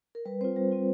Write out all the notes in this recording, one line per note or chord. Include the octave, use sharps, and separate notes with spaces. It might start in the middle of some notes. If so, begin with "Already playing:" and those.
A#4
G3 B4
C4 F4 C5
G3 C5
C4 F4